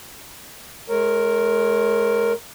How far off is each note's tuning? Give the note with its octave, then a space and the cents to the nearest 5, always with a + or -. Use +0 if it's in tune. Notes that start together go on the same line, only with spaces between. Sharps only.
G#3 +30 A#4 +0 C#5 -10